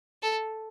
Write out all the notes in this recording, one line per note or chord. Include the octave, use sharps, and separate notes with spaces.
A4